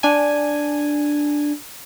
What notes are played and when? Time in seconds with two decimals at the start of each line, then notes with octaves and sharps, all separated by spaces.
0.03 D4 G#5